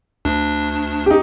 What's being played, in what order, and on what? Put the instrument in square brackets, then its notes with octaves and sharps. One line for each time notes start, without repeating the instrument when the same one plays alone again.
[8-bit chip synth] D2 D4
[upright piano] D#4 G4